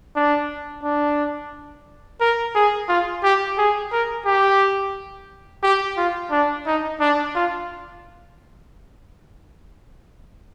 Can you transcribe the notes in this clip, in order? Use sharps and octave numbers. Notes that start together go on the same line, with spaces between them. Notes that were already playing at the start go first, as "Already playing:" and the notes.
D4
D4
A#4
G#4
F4
G4
G#4
A#4
G4
G4
F4
D4
D#4
D4
F4